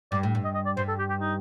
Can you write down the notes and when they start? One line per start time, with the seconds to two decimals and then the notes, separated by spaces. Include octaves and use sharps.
0.12 G2 D5
0.23 A2
0.35 G2
0.44 D#5
0.55 D#5
0.66 D5
0.77 G2 C5
0.88 A4
0.99 G4
1.10 G4
1.20 D#4